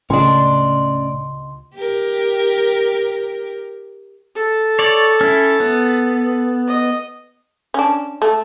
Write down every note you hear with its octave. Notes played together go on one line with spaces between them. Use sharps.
C#2 A2 C#3 C#4 D5 D#5 C6
G4 A#4
A4
C#5 D5
C#4 E4
B3
D#5
C#4 D4
A3